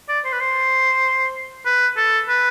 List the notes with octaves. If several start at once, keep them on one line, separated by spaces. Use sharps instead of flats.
D5
C5
B4
C5
B4
A4
B4